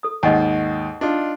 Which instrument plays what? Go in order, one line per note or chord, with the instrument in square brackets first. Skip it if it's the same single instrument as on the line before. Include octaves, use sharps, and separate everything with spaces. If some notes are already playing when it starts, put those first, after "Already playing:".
[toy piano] A4 D#6
[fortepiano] D#2 G#2 [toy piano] D#5 F#5 G#5
[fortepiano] D4 D#4 F4